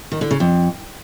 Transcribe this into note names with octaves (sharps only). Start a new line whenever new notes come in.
D#3
D3
C#3
F2